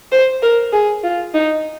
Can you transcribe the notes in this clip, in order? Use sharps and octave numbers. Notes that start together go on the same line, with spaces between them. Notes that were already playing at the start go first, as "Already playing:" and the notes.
C5
A#4
G#4
F4
D#4